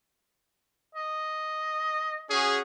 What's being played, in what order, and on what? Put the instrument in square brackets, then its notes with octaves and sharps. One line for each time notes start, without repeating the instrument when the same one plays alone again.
[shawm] D#5
[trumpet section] C#4 F#4 G#4